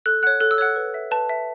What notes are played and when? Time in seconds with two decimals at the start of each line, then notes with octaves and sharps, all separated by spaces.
0.06 A4 F#6
0.23 C#5 F#5 F#6
0.41 A4 F#6
0.51 E6
0.58 C#5 F#5 F#6
0.76 B4
0.94 E5
1.11 B4 A5
1.29 E5